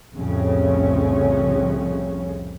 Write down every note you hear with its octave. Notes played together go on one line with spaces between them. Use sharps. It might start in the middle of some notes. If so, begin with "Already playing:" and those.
C2 F2 A2 C#3 C#4